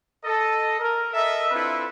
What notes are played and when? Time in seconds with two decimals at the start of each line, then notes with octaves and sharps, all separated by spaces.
0.24 A4 D#5
0.80 A#4
1.14 A4 A#4 D#5 E5
1.51 C4 D4 E4 F4 A4 B4